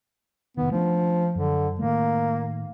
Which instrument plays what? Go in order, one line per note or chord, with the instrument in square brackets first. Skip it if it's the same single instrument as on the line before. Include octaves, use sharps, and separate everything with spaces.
[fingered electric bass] F1 D#3 [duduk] B3
[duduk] F3 [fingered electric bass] A3 D4
[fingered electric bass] F#2 [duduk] D3
[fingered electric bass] A2 D#3 A3 [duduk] A#3